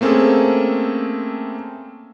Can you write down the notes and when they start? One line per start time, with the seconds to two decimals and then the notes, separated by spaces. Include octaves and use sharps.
0.01 A3 A#3 C4 C#4 G#4 A4